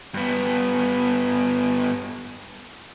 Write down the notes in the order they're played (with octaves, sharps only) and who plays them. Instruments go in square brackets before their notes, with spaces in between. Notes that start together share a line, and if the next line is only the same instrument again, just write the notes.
[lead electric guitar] G2 B3